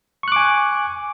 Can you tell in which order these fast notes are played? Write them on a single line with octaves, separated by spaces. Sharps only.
C#6 F#6 D6 G#5